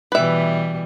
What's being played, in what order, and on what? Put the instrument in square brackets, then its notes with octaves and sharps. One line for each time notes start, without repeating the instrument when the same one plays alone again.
[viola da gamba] B2 E3 G3 [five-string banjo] B4 E5